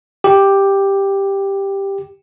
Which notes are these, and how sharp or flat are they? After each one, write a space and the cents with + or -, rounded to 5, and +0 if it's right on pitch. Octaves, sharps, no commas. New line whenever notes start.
G4 +5